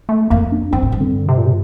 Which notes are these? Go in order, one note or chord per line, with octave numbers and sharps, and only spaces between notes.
A3
F2 A#3
D4
G2 C4
A2
G2
D3
C3
A#2
C3